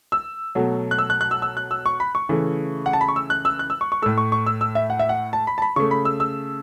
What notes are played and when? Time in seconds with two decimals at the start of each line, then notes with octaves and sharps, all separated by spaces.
0.12 E6
0.55 B2 F#3 A3
0.91 F#6
0.98 E6
1.10 F#6
1.21 F#6
1.31 E6
1.42 E6
1.57 F#6
1.71 E6
1.86 C#6
2.00 B5
2.15 C#6
2.29 C#3 E3 A3
2.86 F#5
2.93 A5
3.01 B5
3.08 C#6
3.16 E6
3.30 F#6
3.45 E6
3.59 F#6
3.70 E6
3.81 C#6
3.92 C#6
4.02 A2 A3 E6
4.18 C#6
4.32 C#6
4.46 E6
4.61 E6
4.75 E5
4.90 F#5
4.99 E5
5.09 F#5
5.33 A5
5.47 B5
5.58 A5
5.62 B5
5.76 C#3 A3 C#6
5.91 B5
6.05 E6
6.20 E6